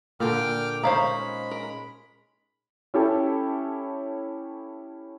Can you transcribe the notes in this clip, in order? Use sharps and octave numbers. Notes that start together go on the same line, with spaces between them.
A#2 D3 G5 D6 F6
G#3 C#4 D#4 C5 F5 A#5 B5
A#4
C#4 E4 G4 A4